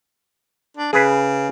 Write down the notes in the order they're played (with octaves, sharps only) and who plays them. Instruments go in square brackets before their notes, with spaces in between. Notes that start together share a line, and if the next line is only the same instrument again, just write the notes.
[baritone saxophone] D4
[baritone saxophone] C#3 [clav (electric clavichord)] G#4 B4